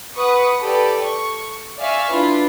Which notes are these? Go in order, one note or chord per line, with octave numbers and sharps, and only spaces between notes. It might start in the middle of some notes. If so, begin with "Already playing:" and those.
B4 F#5 C#6 D#6
G4 A4 B4 D5
C#6
D5 E5 F5 G#5 C#6 F6
D4 E4 F4 B4